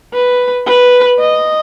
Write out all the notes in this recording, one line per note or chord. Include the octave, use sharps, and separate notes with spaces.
B4
B4
D#5